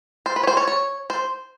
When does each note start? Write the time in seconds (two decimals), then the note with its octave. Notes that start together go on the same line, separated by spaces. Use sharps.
0.26 C5
0.36 B4
0.43 C#5
0.47 C5
0.57 C#5
0.67 C#5
1.10 C5